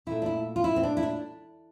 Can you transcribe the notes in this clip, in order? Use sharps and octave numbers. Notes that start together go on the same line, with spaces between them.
A#2 A3 E4
D4
E4
F4
E4
C4
D4
E4
D4